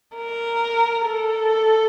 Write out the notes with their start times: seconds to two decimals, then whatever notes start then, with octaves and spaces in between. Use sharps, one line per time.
0.16 A#4
1.06 A4